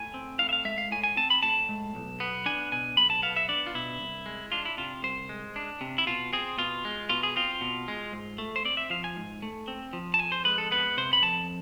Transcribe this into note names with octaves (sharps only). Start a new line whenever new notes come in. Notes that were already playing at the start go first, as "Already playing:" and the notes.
Already playing: A2 G#5
C4
A2 F5
E5
F5
G#3 E5
F5
A2 G#5
G#5
C4 A5
B5
A2 A5
G#3
B1
B3
D4 G#5
B2 G#5
B1 B5
A5
B3 F5
E5
D4 D5
F4
B2 E4
C2
G#3
D4 F4
E4
C3 F4
C2 C5
G#3
D4
C3
E4
B2 F4
C4 G#4
B2 F4
G#3
B2 F4
G#4
C4 F4
B2
G#3
G#2
A3
C5
C4 D5
E5
F3 F5
G#5
G#2
A3
C4
F3
A5
F2 G#5
C5
G#3 B4
A4
B3 B4
C3 C5
B5
F2 A5